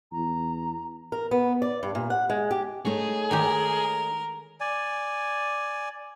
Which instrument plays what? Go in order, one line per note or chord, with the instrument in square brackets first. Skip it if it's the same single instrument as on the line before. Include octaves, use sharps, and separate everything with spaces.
[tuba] E2 [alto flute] A#5
[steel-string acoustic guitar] A#4
B3
D5
G2
A#2
F#5
G#3
G4
[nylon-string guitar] A3 D#4 C#5 [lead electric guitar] G#4
[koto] D#3 G#3 G4 [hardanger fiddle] A#4
[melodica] D5 G#5